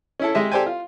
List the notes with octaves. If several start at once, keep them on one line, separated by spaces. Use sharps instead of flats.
C#4 E4 A4
G#3 G4 D#5 E5
G4 A4 C5 D5 G5 G#5
F4